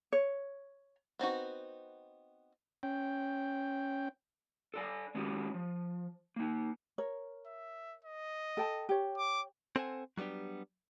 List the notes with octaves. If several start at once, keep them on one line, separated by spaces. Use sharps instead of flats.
C#5
B3 C4 D#4 F#4
C#4 G5
A4 D5 G#5
D#3 G#3 C#4 F#4 G4
F3
A#3 D#4
A#4 C#5
E5
D#5
A4 G5 A5
G4 C#5
D6
C4 A4 C5 F#5 G#5
F#3 G3 B3 D4 G4